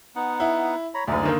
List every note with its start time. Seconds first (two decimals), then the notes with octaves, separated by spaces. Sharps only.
0.16 B3 D#4 F#5
0.40 E4
0.94 C#5 A#5 B5
1.07 F#1 D2 D#4 G#4 D5
1.23 D3 D#3 A#3